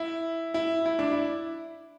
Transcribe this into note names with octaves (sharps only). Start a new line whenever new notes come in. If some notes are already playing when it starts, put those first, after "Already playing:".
Already playing: E4
E4
E4
D4
E4